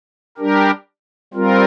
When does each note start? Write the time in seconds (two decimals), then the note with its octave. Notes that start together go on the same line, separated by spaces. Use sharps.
0.38 G3 D4 G4 A#4
1.34 G3 C4 F4 A#4